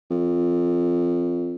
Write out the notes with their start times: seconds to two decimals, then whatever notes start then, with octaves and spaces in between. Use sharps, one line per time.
0.10 F2